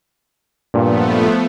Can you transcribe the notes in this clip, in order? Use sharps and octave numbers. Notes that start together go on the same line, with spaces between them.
G2 A#2 F3 A3 B3